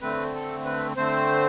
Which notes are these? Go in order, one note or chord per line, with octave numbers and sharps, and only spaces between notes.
D3 A3 C4 B4
A4
B4
D3 A3 C4 C5